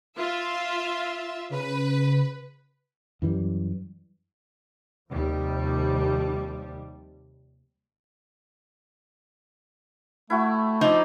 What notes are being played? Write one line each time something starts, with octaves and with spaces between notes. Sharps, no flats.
F4 E5 F5
C#3 B4
F#2 E3 G3
D#2 C3 F3 G3
A3 E4 F#4 G5
F3 D#4 D6 E6